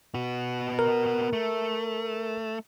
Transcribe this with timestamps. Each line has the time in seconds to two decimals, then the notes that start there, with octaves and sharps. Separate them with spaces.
0.14 B3 F#4
0.79 A#4
1.33 A3